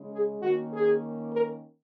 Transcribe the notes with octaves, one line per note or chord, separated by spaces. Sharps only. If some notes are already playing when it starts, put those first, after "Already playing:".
Already playing: C#3 G#3 C#4
G#4
D#3 A#3 C#4 F#4
G#4
A#4